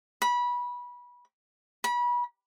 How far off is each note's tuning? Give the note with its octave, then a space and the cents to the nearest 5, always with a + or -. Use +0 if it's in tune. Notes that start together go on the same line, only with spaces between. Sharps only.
B5 -20
B5 -30